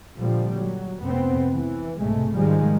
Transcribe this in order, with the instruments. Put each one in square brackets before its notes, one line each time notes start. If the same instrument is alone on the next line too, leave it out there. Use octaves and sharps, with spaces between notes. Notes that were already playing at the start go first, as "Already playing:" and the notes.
[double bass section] A#2 D3 F3 G3
F#3
F1 B3 C4
E3
B1 G#2 C3 G#3 A3
G#2 D#3 F3 G3 G#3